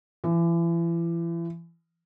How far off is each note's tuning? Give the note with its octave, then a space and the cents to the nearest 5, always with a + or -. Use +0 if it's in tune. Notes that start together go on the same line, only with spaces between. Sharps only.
E3 +35